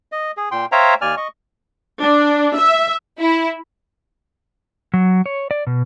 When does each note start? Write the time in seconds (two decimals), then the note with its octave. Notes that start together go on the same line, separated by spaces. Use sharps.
0.12 D#5
0.37 G#4
0.51 A#2 G5 C6
0.72 C5 C#5 E5 F5 G5 A#5
1.01 D#2 D5 G#5 F6
1.17 D#5 C#6
2.01 D4
2.56 E5
3.19 E4
4.94 F#3
5.26 C#5
5.51 D5
5.67 B2